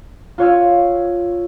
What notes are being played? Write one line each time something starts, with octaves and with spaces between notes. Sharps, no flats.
F4 F#4 C#5 F5 G#5 E6